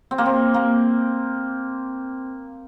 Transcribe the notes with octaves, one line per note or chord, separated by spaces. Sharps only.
C4
A#3
C4
A#3